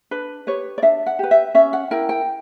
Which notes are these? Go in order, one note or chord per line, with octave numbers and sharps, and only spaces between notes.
D4 B4
G4 B4 C#5
D5
D4 E5
F#5
G4 B4
E5
C#4 E5
F#5
E4 A#4 G5
G5